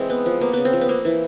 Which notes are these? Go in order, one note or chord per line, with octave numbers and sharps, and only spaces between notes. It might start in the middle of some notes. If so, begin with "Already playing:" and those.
Already playing: E3 G#3 C4
B3
F3
A#3 B3
C#3 B3
C4
F3
B3
A#3 C4
E3